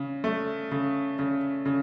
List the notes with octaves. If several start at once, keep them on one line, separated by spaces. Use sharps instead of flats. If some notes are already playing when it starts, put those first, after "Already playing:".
Already playing: C#3
A3
C#3
C#3
C#3